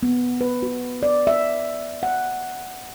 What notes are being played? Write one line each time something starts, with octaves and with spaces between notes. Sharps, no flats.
B3
B4
F#4
D5
E5
F#5